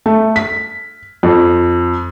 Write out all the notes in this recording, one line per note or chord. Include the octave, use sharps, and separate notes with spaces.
A3
B6
F2